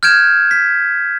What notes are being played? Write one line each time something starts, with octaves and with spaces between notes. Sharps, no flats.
F6 G6 G#6 D7 E7
B6